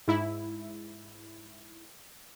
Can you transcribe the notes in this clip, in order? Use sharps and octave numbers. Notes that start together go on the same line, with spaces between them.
G#2 E4